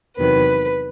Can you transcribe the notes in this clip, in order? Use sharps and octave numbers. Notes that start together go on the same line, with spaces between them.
E2 C3 D#3 F#3 B4